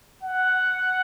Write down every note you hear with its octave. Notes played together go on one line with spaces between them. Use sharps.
F#5